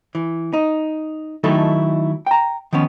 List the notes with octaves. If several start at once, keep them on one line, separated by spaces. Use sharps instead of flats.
E3
D#4
D#3 F#3 A3 D#4 E4 A4
G5 A#5
D#3 F3 B3 C#4